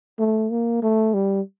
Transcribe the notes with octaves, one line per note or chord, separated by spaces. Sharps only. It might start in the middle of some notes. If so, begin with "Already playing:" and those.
A3
A#3
A3
G3